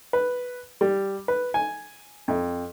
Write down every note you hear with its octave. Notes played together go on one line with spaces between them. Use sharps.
B4
G3
B4
G#5
F2